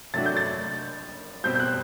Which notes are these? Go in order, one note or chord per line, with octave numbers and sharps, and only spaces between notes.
C3 F#3 A3 D4 F#4 A6
G6
A6
B2 G3 C4 G4 C5 G6
G6
F#6